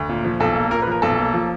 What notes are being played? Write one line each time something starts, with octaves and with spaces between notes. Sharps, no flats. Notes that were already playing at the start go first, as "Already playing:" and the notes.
Already playing: D2
A#2
F3
B1 A4
A#3
A#2 A#4
B4
F3 A#4
B1 A4
A#3
F3